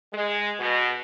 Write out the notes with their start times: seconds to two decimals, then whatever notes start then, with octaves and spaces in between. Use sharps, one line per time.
0.13 G#3
0.60 B2